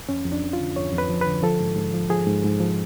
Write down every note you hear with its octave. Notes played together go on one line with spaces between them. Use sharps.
F2 C#4
F2
D4
F3
F4
D3
F2 C#5
F2
B4
F3
D3 B4
F3 A4
G#2
G#2
F3
F3 G#4
G#2
G#2
F3